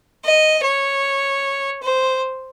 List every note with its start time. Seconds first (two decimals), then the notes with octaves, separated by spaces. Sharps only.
0.24 D#5
0.63 C#5
1.82 C5